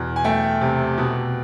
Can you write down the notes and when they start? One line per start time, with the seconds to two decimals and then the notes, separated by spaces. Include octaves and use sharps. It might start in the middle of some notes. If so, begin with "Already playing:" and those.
Already playing: E2 B2
0.16 G#5
0.24 A3 G5
0.61 C3
0.98 B2